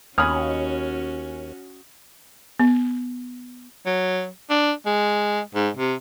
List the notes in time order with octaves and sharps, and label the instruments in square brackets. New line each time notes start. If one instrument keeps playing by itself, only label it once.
[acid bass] D#2 [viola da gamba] C#4 F#4 [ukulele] C#5 B5 [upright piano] G#5 D#6 F6
[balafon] B3
[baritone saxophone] F#3
D4
G#3
G#2
C3